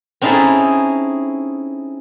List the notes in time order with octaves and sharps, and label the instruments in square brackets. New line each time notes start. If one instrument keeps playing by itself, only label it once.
[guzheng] C4 C#4 D#4 E4 G#4 A4